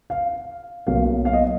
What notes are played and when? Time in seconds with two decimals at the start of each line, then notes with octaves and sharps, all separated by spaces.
0.10 F5
0.87 B1 B2 F#3 A#3 F5
1.25 F5
1.33 D#5